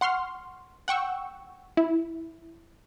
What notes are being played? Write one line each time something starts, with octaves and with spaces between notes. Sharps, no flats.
F#5 C6 C#6 F6
F#5 G5 C#6 E6
E4